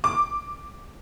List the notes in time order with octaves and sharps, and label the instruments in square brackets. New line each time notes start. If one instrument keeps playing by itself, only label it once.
[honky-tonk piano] D6